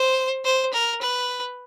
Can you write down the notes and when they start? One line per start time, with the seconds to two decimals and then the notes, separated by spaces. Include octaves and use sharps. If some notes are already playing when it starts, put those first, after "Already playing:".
Already playing: C5
0.44 C5
0.73 A#4
1.01 B4